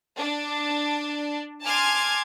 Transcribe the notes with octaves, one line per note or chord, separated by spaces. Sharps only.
D4
G#5 A5 C6 D6 F6 G#6